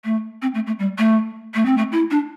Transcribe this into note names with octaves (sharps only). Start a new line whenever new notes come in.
A3
C4
A3
A3
G3
A3
A3
C4
A3
E4
D4